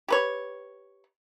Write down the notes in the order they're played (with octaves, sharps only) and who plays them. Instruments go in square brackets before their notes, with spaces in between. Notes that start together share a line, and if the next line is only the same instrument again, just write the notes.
[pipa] G4 B4 C#5